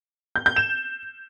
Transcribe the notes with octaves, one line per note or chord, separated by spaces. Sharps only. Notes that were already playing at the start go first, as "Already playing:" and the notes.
G6
G6
E7